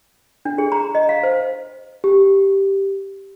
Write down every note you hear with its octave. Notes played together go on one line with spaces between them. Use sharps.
D4
G#4
A#5
D#5
F5
C5
G4